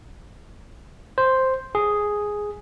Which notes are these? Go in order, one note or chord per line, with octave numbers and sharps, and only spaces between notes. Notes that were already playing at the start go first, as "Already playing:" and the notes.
C5
G#4